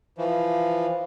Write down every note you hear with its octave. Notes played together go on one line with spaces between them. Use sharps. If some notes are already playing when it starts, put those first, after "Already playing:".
E3 F3